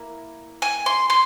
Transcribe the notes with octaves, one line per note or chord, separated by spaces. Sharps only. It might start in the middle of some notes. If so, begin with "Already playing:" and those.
Already playing: A#3 E4
G#5
C6
C6